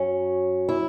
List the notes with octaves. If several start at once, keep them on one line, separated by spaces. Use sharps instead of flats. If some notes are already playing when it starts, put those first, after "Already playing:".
Already playing: F#2 F#3 C#4
E4